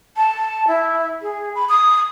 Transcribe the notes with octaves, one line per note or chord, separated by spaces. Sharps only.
A5
E4
G#4
B5
D#6